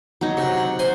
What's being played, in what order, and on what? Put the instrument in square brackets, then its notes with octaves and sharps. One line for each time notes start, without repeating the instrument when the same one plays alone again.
[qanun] F#3 D#4
[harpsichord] C3 [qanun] F#5
[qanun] F#5
[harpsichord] C5 [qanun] G#5